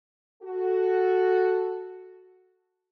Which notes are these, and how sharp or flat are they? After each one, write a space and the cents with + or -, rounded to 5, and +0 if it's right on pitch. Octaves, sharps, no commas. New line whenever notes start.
F#4 +0 A4 +0